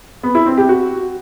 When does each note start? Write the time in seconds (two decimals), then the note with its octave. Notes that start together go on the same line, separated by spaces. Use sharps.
0.23 B3
0.35 E4
0.46 C4
0.57 G4
0.69 F#4